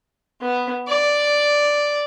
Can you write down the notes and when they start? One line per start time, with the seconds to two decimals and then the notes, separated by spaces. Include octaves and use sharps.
0.41 B3
0.87 D5